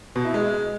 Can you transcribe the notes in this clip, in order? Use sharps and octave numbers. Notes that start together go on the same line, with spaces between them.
B2
E4
G#3